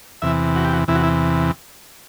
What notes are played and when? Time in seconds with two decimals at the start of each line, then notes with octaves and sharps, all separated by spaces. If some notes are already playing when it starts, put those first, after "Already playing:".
0.22 E2 C3 E3 E5
0.56 F#4
0.65 G4
0.73 F#4
0.88 E2 C3 E3 E4
0.95 F#4
1.03 E4